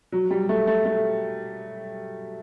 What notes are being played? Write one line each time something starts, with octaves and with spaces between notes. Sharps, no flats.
F#3
G3
A3
A3
A3